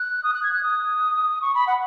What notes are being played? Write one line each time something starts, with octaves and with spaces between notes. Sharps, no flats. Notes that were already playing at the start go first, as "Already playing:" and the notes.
Already playing: F#6
D#6
F#6
G#6
F#6
D#6
C#6
B5
F#5